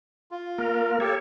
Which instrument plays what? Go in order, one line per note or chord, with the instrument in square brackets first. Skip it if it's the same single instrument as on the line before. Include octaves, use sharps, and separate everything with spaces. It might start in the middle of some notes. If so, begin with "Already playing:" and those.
[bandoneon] F4
[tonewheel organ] A#3 A#4
[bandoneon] G4 [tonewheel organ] A4 C#5